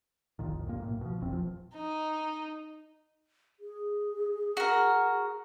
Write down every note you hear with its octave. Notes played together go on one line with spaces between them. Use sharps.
F1 B1 A#2 D#3
B1 G2 A#2 A#3
B1 A2
B2 F3
F1 A#1 E2 C4
F3
D#4
G#4
F#4 A#4